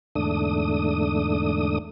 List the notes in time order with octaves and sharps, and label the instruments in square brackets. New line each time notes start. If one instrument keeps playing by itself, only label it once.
[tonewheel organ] E2 G#2 D3 A3 D4 D#6